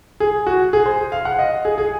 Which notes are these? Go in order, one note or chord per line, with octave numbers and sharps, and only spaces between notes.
G#4
F#4
G#4
C5
F5
F#5
D#5
G#4
G#4